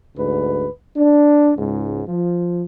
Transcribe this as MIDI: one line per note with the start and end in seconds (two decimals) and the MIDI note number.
0.17 0.67 38
0.17 0.67 44
0.17 0.67 71
0.97 1.52 62
1.57 2.01 37
1.57 2.01 44
2.08 2.63 53